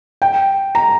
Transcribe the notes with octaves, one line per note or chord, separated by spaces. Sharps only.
G5
A#5